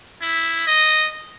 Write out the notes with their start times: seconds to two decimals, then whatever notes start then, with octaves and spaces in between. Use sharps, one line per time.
0.22 E4
0.67 D#5